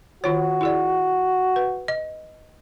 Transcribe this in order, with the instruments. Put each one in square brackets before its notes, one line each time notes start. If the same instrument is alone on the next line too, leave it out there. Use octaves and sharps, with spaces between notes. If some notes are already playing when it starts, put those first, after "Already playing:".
[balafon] D#3 F4 C#5 [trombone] F#4
[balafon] E4 G#4 D5
B4
D#5